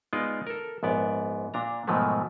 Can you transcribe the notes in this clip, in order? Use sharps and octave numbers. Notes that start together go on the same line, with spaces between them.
G#3 B3 D#4 F4 D5 D#5
A4 A#4
A#1 G#2 B3 D5
A#2 D4 A#5
G#2 B2 D#3 F3 F#3 A3